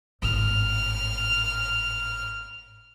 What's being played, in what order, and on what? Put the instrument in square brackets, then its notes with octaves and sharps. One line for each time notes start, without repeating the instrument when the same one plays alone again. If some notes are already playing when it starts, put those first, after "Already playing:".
[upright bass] G#1 A2 [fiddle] F6